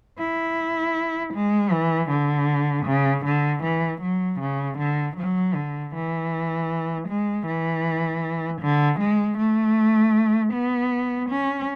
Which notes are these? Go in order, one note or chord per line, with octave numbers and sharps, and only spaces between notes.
E4
G#3
E3
D3
C#3
D3
E3
F#3
C#3
D3
F#3
D3
E3
G#3
E3
D3
G#3
A3
B3
C#4